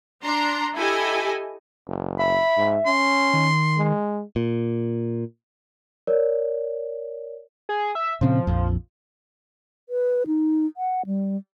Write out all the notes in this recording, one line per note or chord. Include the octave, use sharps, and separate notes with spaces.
D4 A#5 C6
E4 G4 A4 D#5 G#5
F#1
E5 B5
G#2
C#4 C6
D#3
G#3
A#2
A#4 C#5 D5
G#4
E5
A#2 C#3 F3 C4
A#1 F2
B4
D#4
F#5
G3